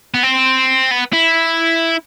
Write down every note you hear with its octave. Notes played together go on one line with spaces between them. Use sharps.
B3
C4
B3
E4